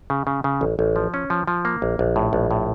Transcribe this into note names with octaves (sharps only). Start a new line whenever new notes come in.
C#3
C#3
C#3
A1
A1
F3
C#4
F3
F3
A#3
A#1
A#1
A2
A#1
A2